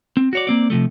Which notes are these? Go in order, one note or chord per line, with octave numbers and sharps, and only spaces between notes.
C4
F#4 C#5 D5
A#3 C4 D5
C3 E3 F3 A3